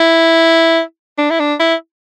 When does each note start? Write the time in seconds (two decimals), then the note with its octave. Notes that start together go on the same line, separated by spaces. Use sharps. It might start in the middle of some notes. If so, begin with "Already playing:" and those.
Already playing: E4
1.18 D4
1.30 E4
1.40 D4
1.60 E4